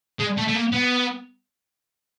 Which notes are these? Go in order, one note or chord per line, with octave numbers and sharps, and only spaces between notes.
G#3
A3
A3
A#3
B3